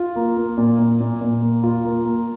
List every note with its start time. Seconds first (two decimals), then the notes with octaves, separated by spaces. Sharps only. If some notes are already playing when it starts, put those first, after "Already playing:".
Already playing: F4
0.16 A#3
0.37 A#3
0.57 A#2
0.79 A#2
1.01 A#2
1.21 A#2
1.42 A#3
1.63 F4
1.85 A#3
2.05 A#3